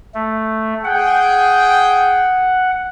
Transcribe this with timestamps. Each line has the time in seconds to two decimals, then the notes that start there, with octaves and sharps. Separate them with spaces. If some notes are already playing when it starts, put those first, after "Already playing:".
0.14 A3
0.84 G#4 F#5 G5